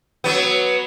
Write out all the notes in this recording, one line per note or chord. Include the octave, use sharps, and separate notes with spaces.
F#3 B3